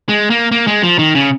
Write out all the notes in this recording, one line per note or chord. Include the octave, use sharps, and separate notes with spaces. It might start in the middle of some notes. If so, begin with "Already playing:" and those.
G#3
A#3
A#3
G#3
F3
D#3
C#3